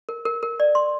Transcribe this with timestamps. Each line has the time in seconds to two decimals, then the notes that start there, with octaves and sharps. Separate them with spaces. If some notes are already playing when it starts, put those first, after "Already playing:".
0.09 A#4
0.25 A#4
0.43 A#4
0.60 D5
0.75 C6